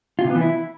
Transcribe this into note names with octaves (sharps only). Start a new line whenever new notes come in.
F4
C3
B3
E3
E4